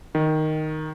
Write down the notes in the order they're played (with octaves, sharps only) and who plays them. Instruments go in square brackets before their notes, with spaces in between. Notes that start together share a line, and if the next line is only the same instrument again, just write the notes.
[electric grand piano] D#3